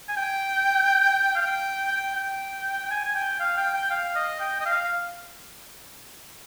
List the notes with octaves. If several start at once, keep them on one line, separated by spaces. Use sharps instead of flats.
G#5
G5
F5
G5
G5
G5
G5
G#5
G#5
G5
F5
G5
G5
F5
D#5
G5
D#5
F5